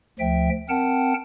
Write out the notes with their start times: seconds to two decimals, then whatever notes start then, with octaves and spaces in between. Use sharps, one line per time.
0.19 D2 F3 E5 G5
0.69 C4 A#4 F#5 G5 A5